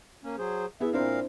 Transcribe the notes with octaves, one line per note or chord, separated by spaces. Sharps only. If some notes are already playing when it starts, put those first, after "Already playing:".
A#3 C#4
F#3 G#4 C5
B3 E4 G#4 E5
A#2 C4 D4 E4 A#4 F5